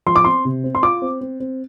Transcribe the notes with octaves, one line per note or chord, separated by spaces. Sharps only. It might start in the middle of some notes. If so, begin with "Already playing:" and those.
F3 C6
D6
C4 C6
C3
C4
C6
F4 D6
C4
C4
C4